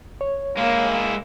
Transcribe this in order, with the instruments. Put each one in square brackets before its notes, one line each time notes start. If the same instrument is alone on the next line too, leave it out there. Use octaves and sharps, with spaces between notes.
[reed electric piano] C#5
[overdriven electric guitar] G#3 E4 [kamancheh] A#3